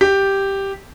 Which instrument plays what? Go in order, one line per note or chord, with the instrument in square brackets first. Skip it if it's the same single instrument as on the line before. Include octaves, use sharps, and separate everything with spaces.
[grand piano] G4